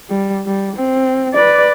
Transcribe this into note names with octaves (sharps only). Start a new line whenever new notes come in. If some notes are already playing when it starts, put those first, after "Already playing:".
G3
G3
C4
B4 D5